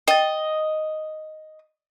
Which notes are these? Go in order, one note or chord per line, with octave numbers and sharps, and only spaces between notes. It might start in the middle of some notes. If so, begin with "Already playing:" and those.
D#5 G5 A6